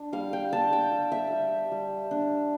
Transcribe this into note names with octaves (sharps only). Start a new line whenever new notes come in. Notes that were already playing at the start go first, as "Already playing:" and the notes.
Already playing: D4
G3 F5
G5
D4 A5
G5
G3
E5
G3
G3
D4